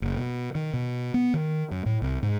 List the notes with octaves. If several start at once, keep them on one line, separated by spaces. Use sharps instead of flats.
F#1
B2
D#3
B2
B3
D#3
F#2
A2
C2
G#2